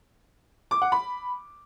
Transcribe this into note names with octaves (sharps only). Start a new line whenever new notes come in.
D6
F#5
B5